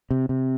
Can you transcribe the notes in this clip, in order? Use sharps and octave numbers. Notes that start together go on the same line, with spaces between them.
C3
C3